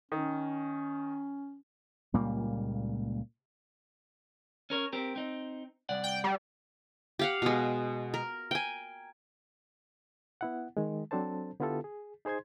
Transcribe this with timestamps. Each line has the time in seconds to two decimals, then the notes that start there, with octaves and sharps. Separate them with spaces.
0.12 D#3 C#4
2.14 C#2 A#2 G3 A#3
4.70 C#4 A#4 C#5
4.93 C4 G4 A#4
5.16 C4 D#4
5.89 C2 D5 F#5
6.04 G5
6.24 G3
7.19 G4 F5 F#5
7.42 B2 G#3
8.14 A#4
8.51 G5 G#5
10.41 B3 E4 F#5
10.77 D#3 G#3
11.11 F#3 C4 D4 A4 C5 A5
11.60 D3 B3 E4 F4 G4 A4
11.84 G#4
12.25 D#4 G#4 C5 C6 G#6